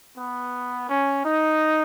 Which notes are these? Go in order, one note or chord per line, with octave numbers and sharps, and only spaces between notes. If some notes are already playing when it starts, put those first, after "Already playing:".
B3
C#4
D#4